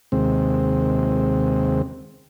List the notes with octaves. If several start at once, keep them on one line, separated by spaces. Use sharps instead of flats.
D#2 C3 G#3 C4